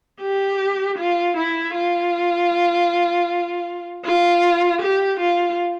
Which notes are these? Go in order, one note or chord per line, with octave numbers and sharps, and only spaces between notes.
G4
F4
E4
F4
F4
G4
F4